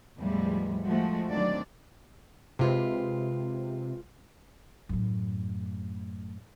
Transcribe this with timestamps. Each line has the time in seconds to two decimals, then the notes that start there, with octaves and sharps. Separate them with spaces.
0.19 E2 A2 F3 G3 G#3
0.85 F3 G#3 A3 F#4
1.29 D2 D#3 F#3 C4 D4 D5
2.59 C3 G#3 F4 B4
4.89 F#2 A2